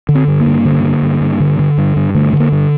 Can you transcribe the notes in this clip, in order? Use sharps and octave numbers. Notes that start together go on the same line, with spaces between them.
D3
C4
G2
A#3
G2
D3
D3
G2
G2
D3
D3
G2
G2
D3 A3
D3
A#3
G2